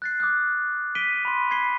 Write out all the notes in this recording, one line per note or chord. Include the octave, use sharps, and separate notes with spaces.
F#6 A6 C7
D6 D#6 F6 F#6
B6 D7 D#7 G7
B5 C6
B5 G#6 B6 C7 G7